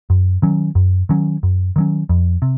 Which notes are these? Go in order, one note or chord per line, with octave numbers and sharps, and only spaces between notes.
F#2
D#3 F#3 C#4
F#2
D#3 F#3 C#4
F#2
D#3 F#3 C#4
F2
C3